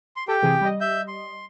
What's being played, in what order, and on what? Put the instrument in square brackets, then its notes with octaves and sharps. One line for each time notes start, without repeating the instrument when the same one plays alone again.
[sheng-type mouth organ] C6
[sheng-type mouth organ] G4 G5 [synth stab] A4
[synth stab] C3 E3 G#4
G3 D#5
[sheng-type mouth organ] E5 G6
C6